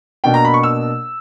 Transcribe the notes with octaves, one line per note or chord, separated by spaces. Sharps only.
B2 A#3 D4 G5
A#5
B5
C#6
E6